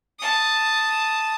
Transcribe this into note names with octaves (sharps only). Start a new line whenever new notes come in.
A5 D#6